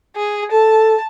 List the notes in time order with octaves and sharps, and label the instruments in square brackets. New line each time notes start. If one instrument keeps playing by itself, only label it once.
[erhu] G#4
[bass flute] A4 [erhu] A5